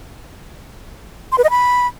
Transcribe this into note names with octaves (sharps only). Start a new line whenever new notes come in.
C6
B4
D#5
B5